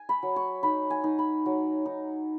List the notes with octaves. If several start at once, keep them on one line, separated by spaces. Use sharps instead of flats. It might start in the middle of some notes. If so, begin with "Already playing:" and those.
Already playing: G#5
B5
F#3
C#6
D#4 B5
G#5
D#4
B5
F#3
D#4